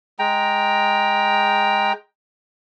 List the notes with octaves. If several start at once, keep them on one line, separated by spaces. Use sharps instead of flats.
G#3 G5 A#5